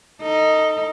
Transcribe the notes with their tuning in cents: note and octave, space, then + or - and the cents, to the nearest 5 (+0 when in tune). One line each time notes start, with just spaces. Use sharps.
D#4 +0 A4 +35